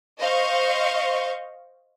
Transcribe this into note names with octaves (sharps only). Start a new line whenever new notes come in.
C5 D#5 F5 C#6